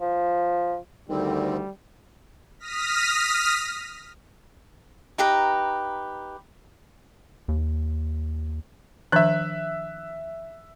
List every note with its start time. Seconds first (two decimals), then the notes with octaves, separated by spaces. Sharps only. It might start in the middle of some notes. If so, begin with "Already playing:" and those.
0.01 F3
1.09 D2 D3 D#3 G3 C4
2.59 D#6 F6 A#6 B6
5.18 D#4 G4 B4 A#5
7.48 D#2
9.12 D#3 F3 D4 E5 F#6